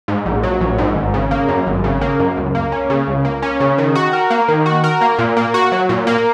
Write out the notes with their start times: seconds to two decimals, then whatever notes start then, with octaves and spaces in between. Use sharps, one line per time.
0.08 G#2
0.26 A#1
0.43 F#3
0.61 A#1
0.78 G#2
0.96 G#1
1.14 C#3
1.31 A#3
1.49 F#2
1.66 G#1
1.84 C#3
2.01 A#3
2.19 F#2
2.37 C#2
2.55 A#3
2.72 C#4
2.90 C#3
3.07 C#2
3.25 A#3
3.42 C#4
3.60 C#3
3.78 D#3
3.95 F#4
4.13 A#4
4.30 A#3
4.48 D#3
4.66 F#4
4.84 A#4
5.01 A#3
5.18 A#2
5.37 A#3
5.54 F#4
5.72 F#3
5.89 A#2
6.07 A#3